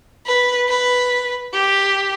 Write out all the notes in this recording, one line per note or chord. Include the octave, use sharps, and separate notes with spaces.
B4
B4
G4